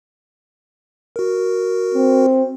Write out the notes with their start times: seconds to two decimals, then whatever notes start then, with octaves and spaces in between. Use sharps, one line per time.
1.16 F#4 A#4
1.94 C4